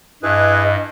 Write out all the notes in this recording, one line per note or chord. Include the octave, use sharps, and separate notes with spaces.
G2 E4 G#4 B4 D#5